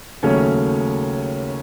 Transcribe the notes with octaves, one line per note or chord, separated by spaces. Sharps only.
D#2 C#3 F#3 A3 C#4 C#5